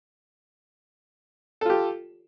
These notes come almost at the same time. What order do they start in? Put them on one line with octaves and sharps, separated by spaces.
A4 F4 G4